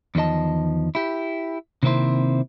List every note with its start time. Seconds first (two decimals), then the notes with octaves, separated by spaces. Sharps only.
0.15 E2 D#3 F3 D#5 A5
0.95 E4 G4
1.83 C3 D#3 A#3 C4 E4 C5